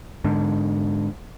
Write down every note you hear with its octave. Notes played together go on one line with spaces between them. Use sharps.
G#2 D3